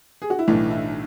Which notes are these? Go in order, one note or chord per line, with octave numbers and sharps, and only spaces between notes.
G#4
F#4
E4
B1 A2 E3 D4
E4